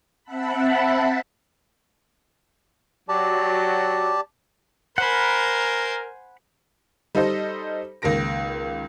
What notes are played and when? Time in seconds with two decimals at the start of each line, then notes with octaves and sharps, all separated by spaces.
0.24 C4 E5 F#5 A5 B5
3.09 F#3 G4 D5 A5
4.98 A#4 C5 F#5 G#5 B5
7.15 G3 D#4 A4 C5 D#5
8.02 C#2 D#3 A#3 A#6 D7